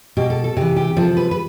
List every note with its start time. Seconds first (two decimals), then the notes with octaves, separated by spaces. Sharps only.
0.17 B2 G4
0.30 A4
0.44 A4
0.57 C3 E3 G4
0.76 G4
0.97 C3 F3 A4
1.17 B4
1.31 B4